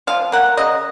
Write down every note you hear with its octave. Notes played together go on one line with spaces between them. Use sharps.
F3 F5
A#3 F#5
C#3 D#5